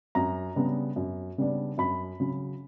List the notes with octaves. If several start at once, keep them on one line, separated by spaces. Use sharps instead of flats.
F#2 A#5
C#3 G3 B3 D4
F#2
C#3 G3 B3 D4
F#2 B5
C#3 F#3